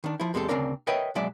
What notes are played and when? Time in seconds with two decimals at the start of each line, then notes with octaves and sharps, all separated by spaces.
0.04 D#3 D4
0.20 F3 E4
0.34 E2 G#3 C4 G4 A4
0.49 D2 C#3 C4 D4 A#4 D5
0.87 A#4 B4 C#5 D#5 E5 G5
1.15 B1 F#3 G#3 D5 E5